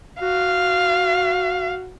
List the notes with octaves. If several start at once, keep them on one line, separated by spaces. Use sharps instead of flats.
F#4 F5